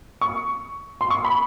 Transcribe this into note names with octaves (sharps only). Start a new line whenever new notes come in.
C#6
C6
C#6
B5